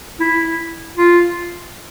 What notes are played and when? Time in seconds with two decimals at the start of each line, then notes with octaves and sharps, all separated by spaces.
0.20 E4
0.97 F4